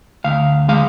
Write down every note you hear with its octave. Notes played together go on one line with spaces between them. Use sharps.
D2 F5
G#3 F5